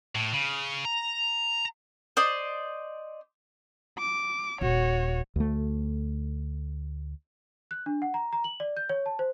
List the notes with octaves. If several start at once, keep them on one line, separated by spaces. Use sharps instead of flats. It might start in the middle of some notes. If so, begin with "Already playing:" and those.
A2
C#3
A#5
C5 D5 D#5
D6
D#1 F#4 C#5
D2 A3
F#6
D4
F#5
A#5
A#5
F#7
D5
G6
C#5
A5
C5